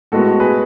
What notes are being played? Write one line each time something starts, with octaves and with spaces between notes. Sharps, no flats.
A2 G#3 B3 F#4 A4
G#4 B4